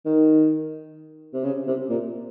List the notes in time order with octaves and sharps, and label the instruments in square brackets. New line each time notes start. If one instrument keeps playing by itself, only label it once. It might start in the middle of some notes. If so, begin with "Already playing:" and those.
[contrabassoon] D#3
C3
C#3
C3
A#2